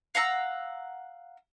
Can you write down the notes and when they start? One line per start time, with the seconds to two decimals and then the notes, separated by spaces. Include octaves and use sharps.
0.15 F5 F#5 A#5 E6